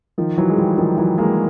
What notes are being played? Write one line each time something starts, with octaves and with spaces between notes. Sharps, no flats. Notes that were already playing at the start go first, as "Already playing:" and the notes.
D#3 F3
E3 F#3
G#3
F3 G3
D#3 F3
E3 F#3
G#3 A#3